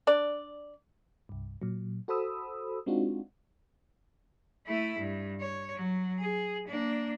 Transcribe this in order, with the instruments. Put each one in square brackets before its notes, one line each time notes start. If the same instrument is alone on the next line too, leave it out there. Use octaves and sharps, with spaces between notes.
[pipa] D4 D5
[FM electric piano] C2 G2
A#2 F#3
F#4 A4 C5 B5 D#6 E6
G#3 C4 D4 D#4 F4 F#4
[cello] A3 E4
G2
C#5
F#3
G#4
A#3 D4